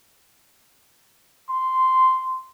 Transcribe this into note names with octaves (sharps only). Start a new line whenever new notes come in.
C6